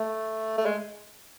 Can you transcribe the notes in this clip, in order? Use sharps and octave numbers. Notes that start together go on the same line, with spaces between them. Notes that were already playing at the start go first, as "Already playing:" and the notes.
Already playing: A3
A3
G#3